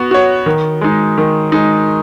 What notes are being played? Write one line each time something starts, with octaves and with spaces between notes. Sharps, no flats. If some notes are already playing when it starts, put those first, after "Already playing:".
Already playing: B3 F#4
F#4 C#5
D#3
G#3 D#4
D#3
G#3 D#4